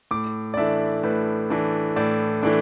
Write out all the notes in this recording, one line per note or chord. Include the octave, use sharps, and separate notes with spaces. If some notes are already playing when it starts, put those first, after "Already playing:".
A2 D6
D5
E3 A3 D4 E5
A2 B4
E3 A3 D4
A2 D5
E3 A3 D4